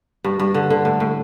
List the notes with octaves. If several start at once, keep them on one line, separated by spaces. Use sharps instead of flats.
G2
G2
D3
D3
A2
A2